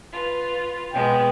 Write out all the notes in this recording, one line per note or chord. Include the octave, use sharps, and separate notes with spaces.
F4 B4
B2 G#3 B3 G5